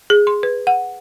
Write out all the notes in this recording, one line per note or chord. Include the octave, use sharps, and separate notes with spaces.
G#4
C6
B4
F#5